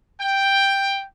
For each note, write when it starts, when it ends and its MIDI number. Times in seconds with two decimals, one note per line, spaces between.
0.21 1.04 79